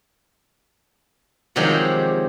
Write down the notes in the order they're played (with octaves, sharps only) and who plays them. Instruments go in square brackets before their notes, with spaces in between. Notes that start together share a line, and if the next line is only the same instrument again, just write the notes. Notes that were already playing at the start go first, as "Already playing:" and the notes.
[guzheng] C3 D#3 F3 F#3 G#3 G4